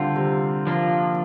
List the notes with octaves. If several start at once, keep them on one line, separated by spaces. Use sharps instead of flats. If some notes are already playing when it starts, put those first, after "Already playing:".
Already playing: D3 G3 C4 F4
C3
F3 A#3 D4 F4